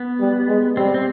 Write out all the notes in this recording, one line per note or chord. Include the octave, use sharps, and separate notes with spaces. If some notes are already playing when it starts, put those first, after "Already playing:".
Already playing: B3
G3
G#3
G3 C4
C4